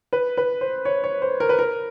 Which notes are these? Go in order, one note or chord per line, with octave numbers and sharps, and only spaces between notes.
B4
B4
C5
C#5
C#5
C5
A#4
B4
A#4